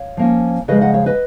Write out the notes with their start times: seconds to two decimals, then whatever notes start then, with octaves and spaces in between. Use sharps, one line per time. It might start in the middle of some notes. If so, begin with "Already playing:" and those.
Already playing: C#5 F5
0.17 F3 A#3 C#4
0.68 C#3 F3 G#3 B4 D#5
0.81 D#5 F#5
0.94 C#5 F5
1.06 B4 D#5